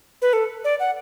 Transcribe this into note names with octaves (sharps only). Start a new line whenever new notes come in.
B4
A4
D5
F#5